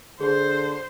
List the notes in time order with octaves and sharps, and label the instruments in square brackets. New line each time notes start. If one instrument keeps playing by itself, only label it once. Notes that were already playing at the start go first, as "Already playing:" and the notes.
[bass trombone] D3 [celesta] G#4 [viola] C5